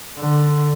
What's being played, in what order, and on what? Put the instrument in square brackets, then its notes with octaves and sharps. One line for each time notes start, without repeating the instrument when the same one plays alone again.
[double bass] D3